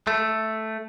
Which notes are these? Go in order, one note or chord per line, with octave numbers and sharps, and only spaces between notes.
A3